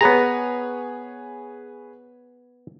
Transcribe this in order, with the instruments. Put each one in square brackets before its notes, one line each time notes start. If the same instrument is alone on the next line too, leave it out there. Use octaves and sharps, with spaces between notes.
[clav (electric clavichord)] B3 A#5 [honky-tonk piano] G#4 B4 C#5